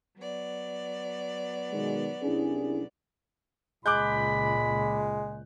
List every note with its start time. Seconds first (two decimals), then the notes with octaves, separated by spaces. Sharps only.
0.16 F#3 B3 D5
1.72 B2 D#3 G#3
2.23 C2 C#4 D4 E4 G#4
3.86 C#2 A#2 G#3 B5 D6 F#6 G6